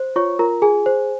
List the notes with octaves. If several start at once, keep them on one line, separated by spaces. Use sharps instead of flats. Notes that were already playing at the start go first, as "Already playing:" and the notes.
Already playing: C5
F4 C#5 C#6
F4 A#4 A#5
G#4 G#5
C5